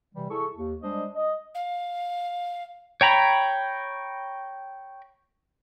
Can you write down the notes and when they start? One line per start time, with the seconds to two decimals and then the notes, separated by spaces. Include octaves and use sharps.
0.15 C3 E3 G3
0.29 E4 G#4 A4 C#6
0.55 D#2
0.82 G3 G#3 D4 C5 D#5
1.16 D#5
1.55 F5
3.01 C#5 G5 A#5 B5